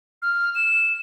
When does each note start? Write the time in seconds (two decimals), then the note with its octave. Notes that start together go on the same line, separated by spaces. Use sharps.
0.22 F6
0.55 E7